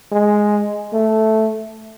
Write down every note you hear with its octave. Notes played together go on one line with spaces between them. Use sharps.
G#3
A3